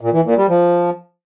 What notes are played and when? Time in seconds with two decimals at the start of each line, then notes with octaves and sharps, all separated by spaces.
0.01 A#2
0.13 E3
0.25 A#2
0.37 G3
0.49 F3